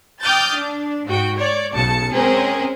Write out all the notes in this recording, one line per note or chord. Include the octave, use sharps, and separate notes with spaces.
G5 D6 D#6 F6 G6 A6
D4
G#2 F#4 G5
C#5 D5
B1 C#3 A5 C#7
G#3 C4 C#4 G#4 A#4 C5